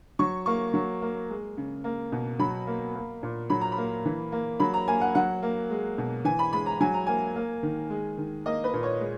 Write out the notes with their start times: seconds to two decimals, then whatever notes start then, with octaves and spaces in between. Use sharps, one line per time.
0.19 F#3 C#6
0.46 A#3 C#6
0.74 F#3
1.02 A#3
1.30 G#3
1.57 C#3
1.84 A#3
2.12 B2
2.39 F#3 B5
2.67 A#3
2.95 A#3
3.23 A#2
3.50 F#3 B5
3.61 A#5
3.72 B5
3.78 A#3
4.05 E3
4.32 A#3
4.60 F#3 B5
4.74 A#5
4.88 A#3 G#5
5.01 F#5
5.15 F#3 F#5
5.43 A#3
5.70 G#3
5.98 B2
6.25 E3 G#5
6.39 B5
6.53 G#3 B5
6.66 A#5
6.81 F#3 G#5
6.94 A#5
7.07 A#3 G#5
7.36 A#3
7.63 D#3
7.90 G#3
8.18 D#3
8.46 A#3 D#5
8.64 B4
8.74 A#2
8.83 C#5
9.01 G#3